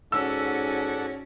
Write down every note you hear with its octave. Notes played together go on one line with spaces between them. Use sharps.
G#2 C#4 F#4 A4 D5 F#5 E6